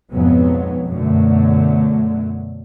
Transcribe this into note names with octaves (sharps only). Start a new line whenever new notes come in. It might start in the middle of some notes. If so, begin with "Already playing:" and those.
B1 F2 G#2 F#3 B3
F#2 B2 D3 F#3 A3